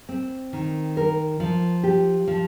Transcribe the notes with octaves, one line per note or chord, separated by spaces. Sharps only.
C4
D#3
A#4
F3
G4
F3